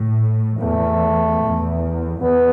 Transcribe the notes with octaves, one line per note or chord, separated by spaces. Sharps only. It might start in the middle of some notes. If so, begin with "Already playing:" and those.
Already playing: A2
E2 A3
E2
E2 B3